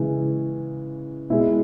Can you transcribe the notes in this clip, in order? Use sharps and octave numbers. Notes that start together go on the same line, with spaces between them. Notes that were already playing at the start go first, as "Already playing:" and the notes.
Already playing: C#3 E3 G#3
B2 G#3 E4